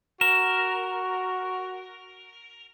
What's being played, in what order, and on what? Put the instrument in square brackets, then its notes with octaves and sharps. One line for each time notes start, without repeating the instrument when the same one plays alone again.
[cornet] F#4 [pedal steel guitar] A#4 [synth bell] E7